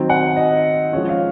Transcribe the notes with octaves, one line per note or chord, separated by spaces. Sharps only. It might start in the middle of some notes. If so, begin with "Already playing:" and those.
Already playing: D#3 F#3 C4
F#5
D#5
F3 G#3 C#4 C#5
F5